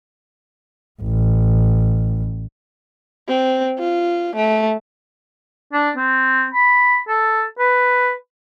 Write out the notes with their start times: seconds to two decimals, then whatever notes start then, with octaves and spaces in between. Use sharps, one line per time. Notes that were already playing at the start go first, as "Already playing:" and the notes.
1.02 A1
3.28 C4
3.79 F4
4.36 A3
5.73 D4
5.96 C4
6.53 B5
7.08 A4
7.59 B4